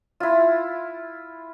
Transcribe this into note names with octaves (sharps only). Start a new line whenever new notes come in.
E4 F4